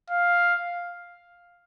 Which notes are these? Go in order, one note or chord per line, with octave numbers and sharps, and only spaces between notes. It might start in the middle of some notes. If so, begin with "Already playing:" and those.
F5